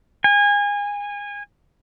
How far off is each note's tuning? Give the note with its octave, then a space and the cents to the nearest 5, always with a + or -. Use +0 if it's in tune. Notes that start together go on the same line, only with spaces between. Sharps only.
G#5 -25